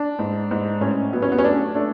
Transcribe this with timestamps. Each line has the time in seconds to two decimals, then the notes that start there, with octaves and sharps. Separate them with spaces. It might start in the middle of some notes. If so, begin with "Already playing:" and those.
Already playing: D4
0.19 G#2
0.51 G#2
0.81 A2 C#4
1.12 F#3 B3
1.22 C#4
1.32 B3
1.38 C#4
1.44 A3 D4
1.75 A3 D4